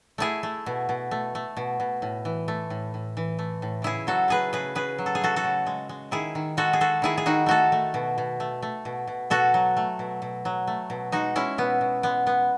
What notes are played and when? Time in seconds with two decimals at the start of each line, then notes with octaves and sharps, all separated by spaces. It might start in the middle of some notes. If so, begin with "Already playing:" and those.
0.18 A3 E4 G#4
0.43 A3
0.66 B2
0.89 B2
1.11 A3
1.35 A3
1.57 B2
1.80 B2
2.02 A2
2.25 E3
2.48 A3
2.70 A2
2.94 A2
3.17 E3
3.39 A3
3.62 A2
3.82 C#3 E4 G#4
4.07 F#3 F#4 A4
4.28 A3 G#4 B4
4.53 C#3 G#4 B4
4.75 C#3 G#4 B4
4.98 F#3
5.06 A4
5.15 G#4
5.21 A3 F#4 A4
5.36 F#4 A4
5.44 C#3
5.67 G#3
5.89 G#3
6.11 D#3 E4 G#4
6.35 D#3
6.57 G#3 F#4 A4
6.73 G#4
6.80 G#3 F#4 A4
7.02 D#3 E4 G#4
7.18 G#4
7.26 D#3 D#4 F#4
7.46 A3 F#4 A4
7.72 A3
7.94 B2
8.18 B2
8.40 A3
8.62 A3
8.85 B2
9.07 B2
9.30 B2 F#4 A4
9.54 F#3
9.77 A3
9.99 B2
10.22 B2
10.45 F#3
10.67 A3
10.90 B2
11.12 G#3 D#4 F#4
11.36 G#3 C#4 E4
11.58 B2 B3
11.81 B2
12.03 G#3 B3
12.26 G#3 B3